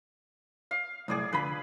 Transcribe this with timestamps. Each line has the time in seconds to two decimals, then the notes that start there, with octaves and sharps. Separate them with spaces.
0.71 F5
1.08 C2 F#2 A2 G#4 D5 D#6
1.33 F2 D3 B4 B5